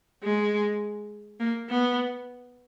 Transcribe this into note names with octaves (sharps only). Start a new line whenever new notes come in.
G#3
A#3
B3